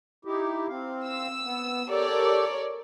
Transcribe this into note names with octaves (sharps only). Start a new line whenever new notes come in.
D#4 E4 G4
C4 F5
E6
B3
G4 A4 A#4 C#5 D5